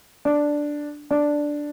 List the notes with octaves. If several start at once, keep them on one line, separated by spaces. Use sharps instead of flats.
D4
D4